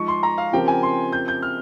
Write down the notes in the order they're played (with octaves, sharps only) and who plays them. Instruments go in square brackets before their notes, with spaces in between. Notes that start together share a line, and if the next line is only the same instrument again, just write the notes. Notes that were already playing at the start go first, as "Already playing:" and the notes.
Already playing: [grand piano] F3 G#3 D#4 [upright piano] C#6
[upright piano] C6
A#5
F5
[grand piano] C#3 F3 C4 G4 A#4 [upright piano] G5
[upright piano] G#5
C6
G6
G6
F6